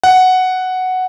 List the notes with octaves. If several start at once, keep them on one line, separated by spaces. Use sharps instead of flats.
F#5